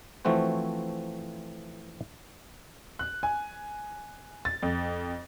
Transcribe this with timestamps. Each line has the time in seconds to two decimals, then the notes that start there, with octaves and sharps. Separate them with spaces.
0.25 E3 F3 A3 C4 F#4 C5
2.99 F#6
3.23 G#5
4.45 A6
4.63 F2